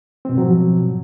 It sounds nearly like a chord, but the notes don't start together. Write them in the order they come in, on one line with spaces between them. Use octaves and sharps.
C4 B2 G#2 F#3 F3